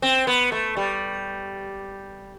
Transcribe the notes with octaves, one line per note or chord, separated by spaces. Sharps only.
C4
B3
A3
G3